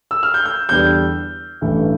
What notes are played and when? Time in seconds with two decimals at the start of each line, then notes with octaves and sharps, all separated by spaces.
0.11 E6
0.23 F6
0.34 G6
0.45 G6
0.69 E2 D3 G3 D4 G6
1.61 A1 G2 E3 A3